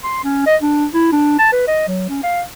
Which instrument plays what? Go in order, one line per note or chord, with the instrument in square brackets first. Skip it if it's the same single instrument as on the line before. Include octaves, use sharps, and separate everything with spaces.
[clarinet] C6
C#4
D#5
D4
E4
D4
A5
B4
D#5
F#3
C#4
F5